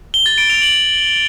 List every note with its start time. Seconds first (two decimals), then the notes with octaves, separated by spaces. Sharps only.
0.14 G7
0.26 A6
0.38 D7
0.50 F7
0.62 F#7